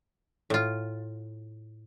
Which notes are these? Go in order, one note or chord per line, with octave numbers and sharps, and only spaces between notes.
A2 F4